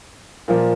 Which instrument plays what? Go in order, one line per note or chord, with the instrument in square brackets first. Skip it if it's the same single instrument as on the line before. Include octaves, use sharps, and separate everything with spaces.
[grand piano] A#2 F3 A#3